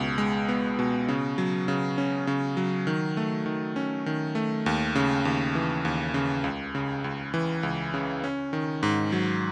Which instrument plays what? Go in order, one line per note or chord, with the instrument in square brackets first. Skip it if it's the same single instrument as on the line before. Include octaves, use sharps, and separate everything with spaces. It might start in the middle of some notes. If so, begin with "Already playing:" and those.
Already playing: [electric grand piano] C#2 B2 B3
G#3
B3
B2
C#3
F#3
C#3
C#4
C#3
F#3
D#3
A3
D#3
C#4
D#3
A3
D#2
C#3
D#2
E3
D#2
C#3
C#2
C#3
C#2
E3
C#2
C#3
C#4
D#3
G#2
F#3